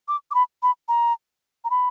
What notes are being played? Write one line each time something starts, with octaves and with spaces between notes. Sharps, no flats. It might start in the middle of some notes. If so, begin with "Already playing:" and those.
D6
D6
B5
B5
A#5
A#5
B5